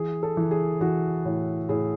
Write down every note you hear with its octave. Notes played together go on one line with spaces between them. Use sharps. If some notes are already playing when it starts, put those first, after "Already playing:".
Already playing: E3 G#4
A4
E3
G#4
E3 F#4
A2
A2 G#4